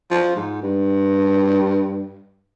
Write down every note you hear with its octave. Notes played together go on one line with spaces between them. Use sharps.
F3
G#2
G2